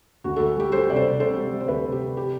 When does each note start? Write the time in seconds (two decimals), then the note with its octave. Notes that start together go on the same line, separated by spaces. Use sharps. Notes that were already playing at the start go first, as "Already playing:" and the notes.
0.24 D2 F#4
0.36 D2 F#4 A4
0.56 G3 G4
0.72 G3 A4 C5
0.89 C3 D5
0.96 A4 C5
1.04 C3
1.20 C3 A4 C5
1.37 G3
1.52 G3
1.60 C5
1.68 D2 G4 B4
1.84 C3
1.92 G4
2.01 C3
2.17 G4